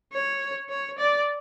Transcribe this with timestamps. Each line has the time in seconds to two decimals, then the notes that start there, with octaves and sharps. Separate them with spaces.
0.13 C#5
0.70 C#5
0.99 D5